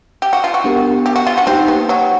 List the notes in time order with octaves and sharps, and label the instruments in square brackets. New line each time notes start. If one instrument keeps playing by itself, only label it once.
[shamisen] G4
F#4
F4
F#4
[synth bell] B3 D4 G4 A#4
[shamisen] G4
F#4
F4
F#4
[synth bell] A#3 D#4 G4 C5 [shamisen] C4
[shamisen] B3
F#3